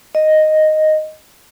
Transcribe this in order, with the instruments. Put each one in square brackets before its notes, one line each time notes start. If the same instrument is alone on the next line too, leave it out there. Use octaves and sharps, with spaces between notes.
[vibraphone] D#5